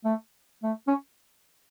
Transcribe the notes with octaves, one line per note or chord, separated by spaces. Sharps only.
A3
A3
C#4